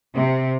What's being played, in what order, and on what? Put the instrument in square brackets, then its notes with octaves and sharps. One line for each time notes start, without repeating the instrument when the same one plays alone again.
[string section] C3